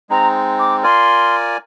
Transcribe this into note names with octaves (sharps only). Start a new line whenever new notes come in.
G#3 C4 D#4 A#5
D6
F4 A#4 D5 G#5 C6